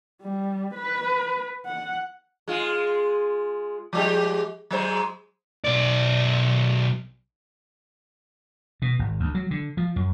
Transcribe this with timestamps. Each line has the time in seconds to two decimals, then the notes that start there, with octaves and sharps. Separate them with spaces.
0.22 G3
0.74 B4
1.65 F#5
2.48 G#3 F4
3.93 F3 G#3 G4
4.71 F#3 G#3 C5
5.65 B1 D5
8.82 B2
8.99 G#1
9.20 D2
9.35 F#3
9.51 D3
9.77 F3
9.96 F#2